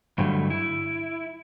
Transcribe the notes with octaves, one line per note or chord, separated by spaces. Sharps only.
G2 D3 F#3 G3 A3
E4